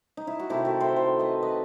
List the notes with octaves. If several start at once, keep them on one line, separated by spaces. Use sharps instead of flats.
D#4
E4
F#4
C3 D#3 A3 E4 G4
F#4 A4
A4 C5
A4 C5
B4 D#5
B4 D#5